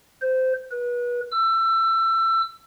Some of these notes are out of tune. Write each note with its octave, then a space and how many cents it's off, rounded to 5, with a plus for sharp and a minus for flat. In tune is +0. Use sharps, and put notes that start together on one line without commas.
C5 -15
B4 -30
E6 +25